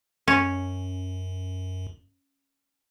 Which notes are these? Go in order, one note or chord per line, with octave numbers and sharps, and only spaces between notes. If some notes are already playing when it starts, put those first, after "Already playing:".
F#2 C#4